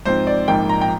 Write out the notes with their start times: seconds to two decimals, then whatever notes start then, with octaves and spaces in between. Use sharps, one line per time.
0.05 G#2 F3 C4 C5
0.27 D5
0.48 A#1 G#2 F3 A#3 D#4 G5
0.69 A#5
0.81 G5